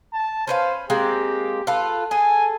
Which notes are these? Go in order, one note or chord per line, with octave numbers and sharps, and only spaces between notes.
A5
C#4 B4 C5 F5
G#3 A#3 C4 G4
F4 A4 B4
G#4 A4 G#5